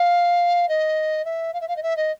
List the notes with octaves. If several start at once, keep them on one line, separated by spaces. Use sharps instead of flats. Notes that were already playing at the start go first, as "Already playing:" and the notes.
Already playing: F5
D#5
E5
F5
E5
F5
D#5
E5
D#5